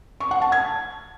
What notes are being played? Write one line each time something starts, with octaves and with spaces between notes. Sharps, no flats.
C#6
F#5
A5
G#6